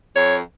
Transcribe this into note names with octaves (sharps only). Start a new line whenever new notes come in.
F2 C#5